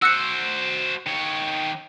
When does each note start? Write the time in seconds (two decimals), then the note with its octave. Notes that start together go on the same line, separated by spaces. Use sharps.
0.02 F#4 C5 E6 F#6 C#7
1.06 D#3 C#5